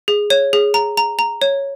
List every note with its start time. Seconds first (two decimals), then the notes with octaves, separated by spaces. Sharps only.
0.08 G#4
0.30 C#5
0.53 G#4
0.74 A#5
0.97 A#5
1.19 A#5
1.42 C#5